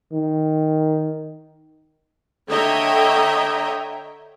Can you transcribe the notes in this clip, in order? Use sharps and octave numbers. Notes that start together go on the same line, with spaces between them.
D#3
D3 C#5 D#5 E5 G5 A#5